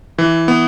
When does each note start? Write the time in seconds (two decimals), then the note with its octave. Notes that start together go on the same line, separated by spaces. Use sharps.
0.18 E3
0.48 B3